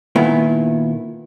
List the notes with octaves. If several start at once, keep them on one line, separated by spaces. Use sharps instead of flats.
A#2 D#3 B3 E4